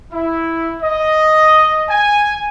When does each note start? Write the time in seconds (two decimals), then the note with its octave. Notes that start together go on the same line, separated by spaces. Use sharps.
0.12 E4
0.83 D#5
1.89 G#5